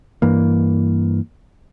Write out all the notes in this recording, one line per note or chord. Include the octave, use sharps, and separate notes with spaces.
G2 E3 A#3